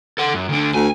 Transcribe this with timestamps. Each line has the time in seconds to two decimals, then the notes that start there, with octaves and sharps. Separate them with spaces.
0.18 A4 F#5
0.34 F#2
0.49 D2 D3
0.74 D2 G#5